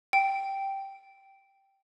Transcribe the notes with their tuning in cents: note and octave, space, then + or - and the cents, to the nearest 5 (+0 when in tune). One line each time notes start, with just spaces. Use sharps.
G5 -5